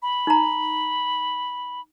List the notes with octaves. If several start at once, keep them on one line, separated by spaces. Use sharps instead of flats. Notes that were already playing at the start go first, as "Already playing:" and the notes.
B5
D#4 A#5